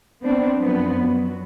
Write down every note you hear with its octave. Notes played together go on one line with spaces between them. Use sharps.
B3 C4 D4
F#2 F3 B3
F#3